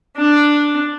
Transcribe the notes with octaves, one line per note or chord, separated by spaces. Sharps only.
D4